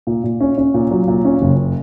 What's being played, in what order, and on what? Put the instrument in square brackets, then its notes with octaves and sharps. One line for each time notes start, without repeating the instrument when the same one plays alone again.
[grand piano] A#2
A#2
C#4
C#4
A#2
F#3
A#2
C#4
F#1